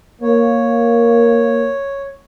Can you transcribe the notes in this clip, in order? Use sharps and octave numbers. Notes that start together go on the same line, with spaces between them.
A#3 C#5